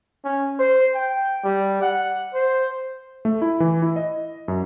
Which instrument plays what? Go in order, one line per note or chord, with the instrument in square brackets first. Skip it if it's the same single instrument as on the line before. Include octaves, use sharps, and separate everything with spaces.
[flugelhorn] C#4
C5
G5
G3
F#5
C5
[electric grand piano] A3
E4
E3
E4
D#5
F#2